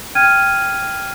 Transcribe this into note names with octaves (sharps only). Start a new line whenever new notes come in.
G5 F6 G#6 D#7